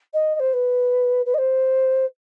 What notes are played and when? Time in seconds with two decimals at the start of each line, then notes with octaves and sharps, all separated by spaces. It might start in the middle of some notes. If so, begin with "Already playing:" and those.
0.13 D#5
0.34 D#5
0.39 C5
0.53 B4
1.25 B4
1.34 D#5
1.38 C5